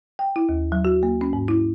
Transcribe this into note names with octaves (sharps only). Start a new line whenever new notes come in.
G5
E4
D#2
F#3
F#4
A#3
C#4
G#2
E4